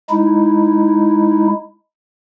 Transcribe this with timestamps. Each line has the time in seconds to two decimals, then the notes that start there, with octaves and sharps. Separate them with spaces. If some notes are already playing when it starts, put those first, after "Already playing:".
0.10 G#3 D#4 E4